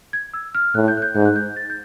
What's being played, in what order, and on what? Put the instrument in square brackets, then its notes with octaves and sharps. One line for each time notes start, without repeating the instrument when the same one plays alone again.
[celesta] G#6
E6
F6
[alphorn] A2 [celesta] F#6
[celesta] G6
F#6
G6
[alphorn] G#2 [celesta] G6
[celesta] F#6
G6
A6
G6